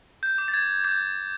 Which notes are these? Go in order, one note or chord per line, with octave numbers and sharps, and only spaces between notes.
G6
D6
A6
G#6
D6 G6